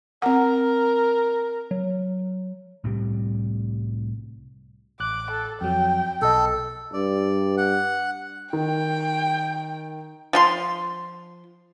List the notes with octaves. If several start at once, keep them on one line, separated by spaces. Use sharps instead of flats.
C4 A#4 F#5
F#3
C2 A2 C3 G3
A1 D6 F#6
A4
F2 F#3 G5
B1 A4 D#5
G2 D5
F#5
D#3 G5
F3 F4 C6